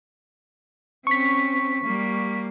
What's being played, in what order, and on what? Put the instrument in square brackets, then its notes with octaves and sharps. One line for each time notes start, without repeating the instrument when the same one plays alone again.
[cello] C4 C#4 [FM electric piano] C#6 B6
[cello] G3 A#3